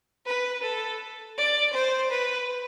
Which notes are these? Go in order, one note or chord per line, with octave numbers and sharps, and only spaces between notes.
B4
A4
D5
C5
B4